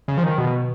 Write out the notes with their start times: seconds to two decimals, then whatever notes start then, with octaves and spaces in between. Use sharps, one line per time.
0.08 C#3
0.17 F3
0.23 D#3
0.38 B2